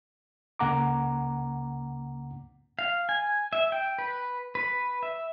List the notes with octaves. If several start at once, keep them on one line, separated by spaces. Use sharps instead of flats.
C#2 C#3 A#3 F#5 A#5 D6
F5
G#5
E5
G5
B4
B4
E5